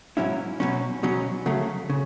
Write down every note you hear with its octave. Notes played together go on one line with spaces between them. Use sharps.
G#2 F#3 C#4 E4
B2 F#3 C#4
B2 F#3 C#4
C#3 F#3 A3
C#3